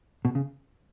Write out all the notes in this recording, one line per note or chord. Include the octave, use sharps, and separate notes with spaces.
B2
C#3